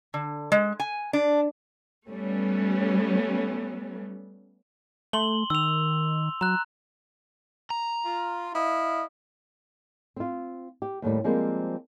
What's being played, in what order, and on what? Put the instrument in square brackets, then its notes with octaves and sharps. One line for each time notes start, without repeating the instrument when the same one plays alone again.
[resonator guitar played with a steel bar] D3
G#3
G#5
D4
[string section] G3 A3 B3 C#4
[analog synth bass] A3 [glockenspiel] C6 F#7 G7
[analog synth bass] D#3 [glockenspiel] E6 F7
[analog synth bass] F#3 [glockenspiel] A#5 F#6
[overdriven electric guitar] A#5
[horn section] F4
E4 D#5 F5
[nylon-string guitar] C4 F4
G4
D#2 A2 G3
F3 G3 G#3 A#3 C4